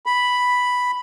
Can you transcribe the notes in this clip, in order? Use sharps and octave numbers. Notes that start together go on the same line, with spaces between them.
B5